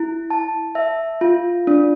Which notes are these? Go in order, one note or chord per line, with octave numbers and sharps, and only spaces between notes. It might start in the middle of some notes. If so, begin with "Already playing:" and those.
Already playing: E4
A5
E5
F4
D4